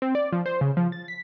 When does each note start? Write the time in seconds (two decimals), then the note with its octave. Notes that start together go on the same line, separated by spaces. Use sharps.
0.02 C4
0.15 D5
0.32 F3
0.46 C5
0.61 C#3
0.77 F3
0.92 A6
1.08 B6